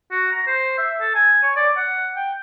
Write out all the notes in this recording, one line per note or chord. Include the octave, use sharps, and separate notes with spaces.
F#4
A#5
C5
E5
A4
G#5
C#5
D5
F#5
G5